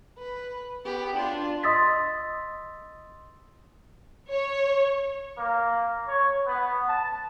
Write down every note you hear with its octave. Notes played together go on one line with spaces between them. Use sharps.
B4
B3 G4
D4 F4
D#5 C6 D#6 E6 A6 B6
C#5
A#3
C#5
B3
A5